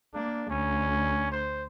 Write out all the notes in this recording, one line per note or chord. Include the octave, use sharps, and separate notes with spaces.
A#3 D4
D2 C#4
C5